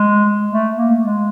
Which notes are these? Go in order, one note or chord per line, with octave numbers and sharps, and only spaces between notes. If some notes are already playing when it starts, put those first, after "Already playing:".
Already playing: G#3
A3
A#3
G#3